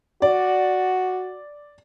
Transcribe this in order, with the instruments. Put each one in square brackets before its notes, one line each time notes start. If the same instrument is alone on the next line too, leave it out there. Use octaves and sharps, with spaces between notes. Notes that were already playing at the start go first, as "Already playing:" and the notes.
[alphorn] F#4 [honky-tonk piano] D5